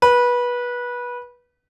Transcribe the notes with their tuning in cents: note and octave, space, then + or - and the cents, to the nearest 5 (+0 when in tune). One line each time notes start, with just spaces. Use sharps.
B4 -20